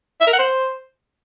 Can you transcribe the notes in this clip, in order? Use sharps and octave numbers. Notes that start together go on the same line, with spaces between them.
E5
A#4
F#5
C5